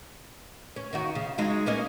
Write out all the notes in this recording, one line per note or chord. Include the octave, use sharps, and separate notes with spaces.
C#4
D#3 D#4 F#4
C#3
F#3 G#3 D#4
A#3 C#4 D#5